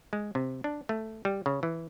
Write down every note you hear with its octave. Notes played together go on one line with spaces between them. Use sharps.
G#3
C3
D4
A3
G3
C#3
E3